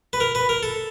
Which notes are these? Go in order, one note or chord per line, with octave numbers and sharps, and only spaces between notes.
B4
A#4
B4
A#4
A4